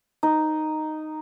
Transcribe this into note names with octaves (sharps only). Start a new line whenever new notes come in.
D#4